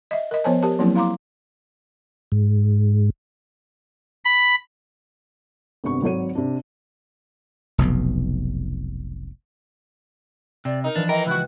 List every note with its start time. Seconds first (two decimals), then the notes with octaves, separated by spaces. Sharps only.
0.11 D#5 E5
0.31 A#4 D#5
0.44 F3 B3 C5 C#5 G#5 A5
0.63 G4 A#4 A5
0.79 F3 F#3 A#3 C4 E4
0.95 E4 F5 A#5 C6 D6
2.32 G#2
4.25 B5
5.84 G#1 G2 C3 B3 C#6
6.02 G#1 F#3 C#5 D#7
6.35 C3 D4
7.78 F1 B1 B2
10.65 C3 D5
10.84 D#4 A#4
10.96 E3 F3 D4
11.09 E3 A#4 D#5 G5
11.27 C#2 E4 F#4 F#6